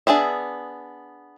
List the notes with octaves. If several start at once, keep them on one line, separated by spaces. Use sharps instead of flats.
B3 D4 G#4 C5 E5